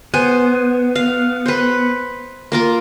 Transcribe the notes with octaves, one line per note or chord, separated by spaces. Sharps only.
B3 C5 G#5
F5
B4 C5
A#3 F4 A#4